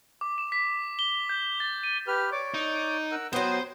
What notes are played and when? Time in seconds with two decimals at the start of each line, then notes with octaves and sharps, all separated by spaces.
0.21 D6
0.38 E7
0.52 B6
0.99 G7
1.29 G6
1.60 A6
1.84 D#7
2.07 G4 B4 F6
2.32 C#5 D5 D6
2.54 D#4
3.11 A#4 F#5 E6
3.33 F#3 B3 C5 G5 C6 D#6